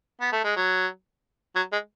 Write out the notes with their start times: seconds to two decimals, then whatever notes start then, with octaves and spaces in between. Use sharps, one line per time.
0.21 B3
0.32 A3
0.44 G#3
0.56 F#3
1.56 F#3
1.73 G#3